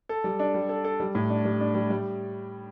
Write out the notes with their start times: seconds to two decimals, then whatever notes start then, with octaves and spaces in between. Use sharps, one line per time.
0.09 A4
0.24 G3
0.39 D4
0.54 G3
0.69 A4
0.84 A4
1.00 G3
1.15 A2
1.30 D4
1.45 G3
1.60 D4
1.75 G3
1.90 G3